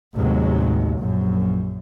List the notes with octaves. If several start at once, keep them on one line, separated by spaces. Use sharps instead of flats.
A1 D#2 C3 F#3 G#3
A#1 F#2